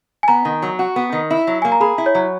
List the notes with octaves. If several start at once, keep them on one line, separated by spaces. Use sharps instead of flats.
G#5
B3 A#5
D#3
F#3
F#4
B3
D#3
E4
F#3
A#3 G#5
A#5
G#4 B5
E4
C#5
F#3